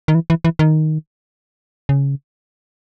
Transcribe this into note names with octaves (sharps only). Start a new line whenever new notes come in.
D#3
E3
E3
E3
D#3
C#3